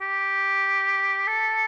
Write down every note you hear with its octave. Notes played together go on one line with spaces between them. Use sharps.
G4
A4